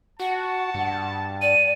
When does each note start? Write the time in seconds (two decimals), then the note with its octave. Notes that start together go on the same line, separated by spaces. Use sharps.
0.20 F#4 F#5 A5
0.74 G2
1.41 D5 D#7